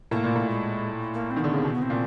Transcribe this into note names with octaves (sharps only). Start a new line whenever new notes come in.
A2 A#3
A#2
A2
G#3
A#3
C4
D#3
D3 B3
C#3
C3
B2 C4
B3
C4
A#2